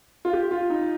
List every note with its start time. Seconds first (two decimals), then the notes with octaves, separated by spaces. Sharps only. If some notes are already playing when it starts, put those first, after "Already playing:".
0.25 F4
0.33 G4
0.51 F4
0.70 D#4